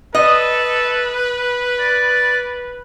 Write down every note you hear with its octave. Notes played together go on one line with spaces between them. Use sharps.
A4 B4 D#5
D5